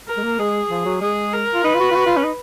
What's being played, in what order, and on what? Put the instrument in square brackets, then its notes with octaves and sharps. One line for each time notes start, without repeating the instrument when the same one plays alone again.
[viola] A#4
[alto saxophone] G#3
A#3
[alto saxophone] G#3 [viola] G#4
[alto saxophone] F3
F#3
[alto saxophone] G#3 [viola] G#4
[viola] A#4
[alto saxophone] F4
[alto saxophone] D#4 [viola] B4
[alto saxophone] F4
F#4
F4
F#4
F4
C#4
D#4